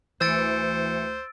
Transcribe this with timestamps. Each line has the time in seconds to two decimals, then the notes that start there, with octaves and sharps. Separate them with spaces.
0.21 D2 E3 C5 E6 A6 C#7 D7